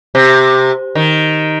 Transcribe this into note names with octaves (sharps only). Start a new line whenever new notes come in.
C3
D#3